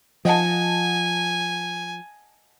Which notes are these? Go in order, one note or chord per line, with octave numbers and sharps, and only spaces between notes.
F3 D#5 F#5 G#5 A5